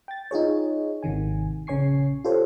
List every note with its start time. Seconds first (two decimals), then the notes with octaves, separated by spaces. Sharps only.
0.08 G5 A6
0.31 D#4 F4 G#4 C#5
1.03 G#1 C3 D#3 G#5
1.67 A#1 C#3 C#5 G#5 C#6 C7
2.24 F4 G4 A4 C5 C#5